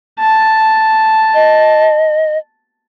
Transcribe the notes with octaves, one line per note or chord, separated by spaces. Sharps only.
A5
D#5